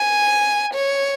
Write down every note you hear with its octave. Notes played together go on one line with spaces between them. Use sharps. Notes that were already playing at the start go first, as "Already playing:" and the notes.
Already playing: G#5
C#5